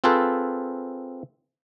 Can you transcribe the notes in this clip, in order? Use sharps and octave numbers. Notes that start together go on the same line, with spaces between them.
C4 F4 G#4 A4 B4 C5